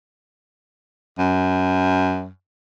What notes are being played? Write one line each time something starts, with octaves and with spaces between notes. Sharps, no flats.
F#2